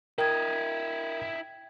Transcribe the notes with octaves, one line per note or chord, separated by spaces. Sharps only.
E4 A#4 D#5 G5 G#6